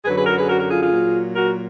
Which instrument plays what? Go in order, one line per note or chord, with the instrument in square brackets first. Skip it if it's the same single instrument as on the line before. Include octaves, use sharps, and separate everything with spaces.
[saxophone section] F#2 D3 F#3 G#4 B4
G#4 B4
F#4 A#4
G#4 B4
F#4 A#4
F#4 A#4
F4 G#4
F4 G#4
A#2 F#3
F#4 A#4